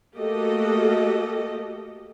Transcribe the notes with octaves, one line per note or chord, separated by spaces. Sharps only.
A3 A#3 F#4 G4 A4 D#5